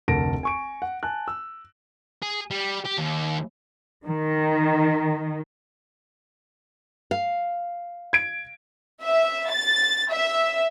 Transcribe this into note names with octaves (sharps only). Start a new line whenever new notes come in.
F1 D2 A#4 A5 A#6 D7
G#5 C#6 D7
F#5
G#5 A5 F#6
E6
G#4
G3
G4
D#2
D#3
F5
G#6 D7
E5
A6
E5